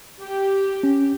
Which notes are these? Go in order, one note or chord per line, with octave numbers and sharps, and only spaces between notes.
G4
C#4